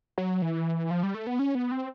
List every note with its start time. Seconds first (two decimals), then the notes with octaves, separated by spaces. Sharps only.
0.18 F#3
0.42 E3
0.91 F3
1.03 G3
1.14 A3
1.27 B3
1.39 C#4
1.55 B3
1.71 C4